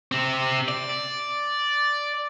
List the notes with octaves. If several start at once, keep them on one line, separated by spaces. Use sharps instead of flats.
C3 C4
D5